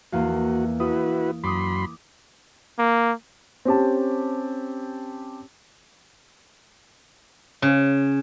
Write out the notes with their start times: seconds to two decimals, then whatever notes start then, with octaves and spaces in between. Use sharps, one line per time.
0.13 E2 A#3 F#4 F5
0.80 E4 F#4 B4 D#6
1.44 F#2 B5 C6 D6 D#6
2.79 A#3
3.65 C4 C#4 G4 A5
7.62 C#3